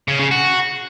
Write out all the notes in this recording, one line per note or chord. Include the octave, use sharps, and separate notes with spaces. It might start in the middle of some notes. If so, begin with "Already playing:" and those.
C#3
C#3
F#4